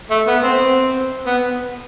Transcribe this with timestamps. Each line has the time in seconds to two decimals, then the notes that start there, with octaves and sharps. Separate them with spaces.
0.10 A3
0.27 B3
0.43 C4
1.26 B3